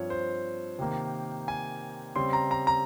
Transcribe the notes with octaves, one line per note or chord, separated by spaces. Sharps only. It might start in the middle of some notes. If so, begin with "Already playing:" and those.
Already playing: G2 F3 C4 C#5
C5
C3 D#3 A#3
G#5
C#3 G3 C4 C6
A#5
A#5
A#5